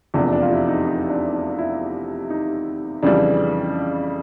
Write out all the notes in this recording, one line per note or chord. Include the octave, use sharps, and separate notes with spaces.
F1 E2 C3 F3 D4
D4
F4
E4
D#4
D#4
D4
D4
E4
D#4
F2 C#3 E3 G3 D4